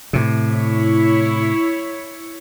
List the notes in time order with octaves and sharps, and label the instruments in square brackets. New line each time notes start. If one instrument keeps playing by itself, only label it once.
[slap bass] A2 C3
[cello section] E4 C#5